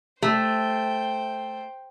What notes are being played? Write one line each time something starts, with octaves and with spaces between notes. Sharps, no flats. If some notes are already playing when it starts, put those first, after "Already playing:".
A3 C5 G5